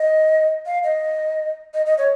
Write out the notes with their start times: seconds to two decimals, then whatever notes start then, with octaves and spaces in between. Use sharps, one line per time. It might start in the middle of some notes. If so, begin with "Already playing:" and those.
Already playing: D#5
0.66 F5
0.84 D#5
1.74 D#5
1.86 D#5
1.98 C#5